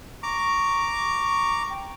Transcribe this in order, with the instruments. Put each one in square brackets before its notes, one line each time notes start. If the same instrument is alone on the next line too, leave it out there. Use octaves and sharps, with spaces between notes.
[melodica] A#5 D6 [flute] C#6
[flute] G5